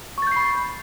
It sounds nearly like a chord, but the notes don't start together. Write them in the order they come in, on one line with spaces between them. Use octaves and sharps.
C#6 A6 G6 C7 B5